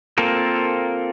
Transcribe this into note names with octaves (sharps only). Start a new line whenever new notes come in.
A#3 C4 F4 A4 A#4